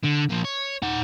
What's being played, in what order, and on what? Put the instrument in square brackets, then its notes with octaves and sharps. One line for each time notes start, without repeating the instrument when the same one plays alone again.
[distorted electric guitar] D3
A#2 F3
C#5
D#4 F#5